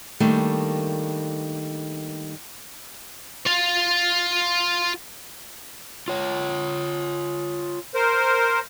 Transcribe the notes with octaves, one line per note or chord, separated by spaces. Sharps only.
D#3 G3 A3 A#3 D4
F4 F5
F4 C#5
A#4 C5